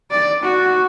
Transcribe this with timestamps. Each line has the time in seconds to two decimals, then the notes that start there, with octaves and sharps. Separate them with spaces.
0.11 D5
0.43 F#4